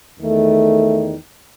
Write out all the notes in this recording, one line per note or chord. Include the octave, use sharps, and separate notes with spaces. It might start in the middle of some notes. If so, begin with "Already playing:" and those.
E2 D#3 A3